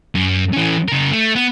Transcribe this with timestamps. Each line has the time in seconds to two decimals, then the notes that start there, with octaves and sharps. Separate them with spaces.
0.15 F#2
0.53 E3 C#4
0.88 C#3 A#4
1.12 A3
1.35 B3